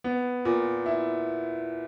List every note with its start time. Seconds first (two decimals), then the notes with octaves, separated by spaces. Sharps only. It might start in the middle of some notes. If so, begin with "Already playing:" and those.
0.04 B3
0.45 A#2
0.86 E4